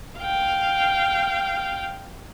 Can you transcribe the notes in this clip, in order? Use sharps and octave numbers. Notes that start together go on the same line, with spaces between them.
F5 G5